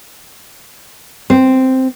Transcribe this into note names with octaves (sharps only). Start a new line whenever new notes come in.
C4